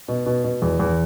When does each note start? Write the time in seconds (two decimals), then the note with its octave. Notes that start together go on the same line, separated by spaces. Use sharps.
0.08 B2
0.26 B2
0.44 B2
0.62 E2
0.79 E2